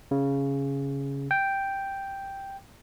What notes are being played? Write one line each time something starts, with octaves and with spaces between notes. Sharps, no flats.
C#3
G5